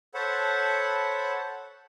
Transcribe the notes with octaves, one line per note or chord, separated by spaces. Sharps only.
A4 C5 C#5 F#5 A5 B5